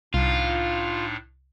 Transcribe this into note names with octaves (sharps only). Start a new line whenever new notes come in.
C2 A2 D4 D#4 F4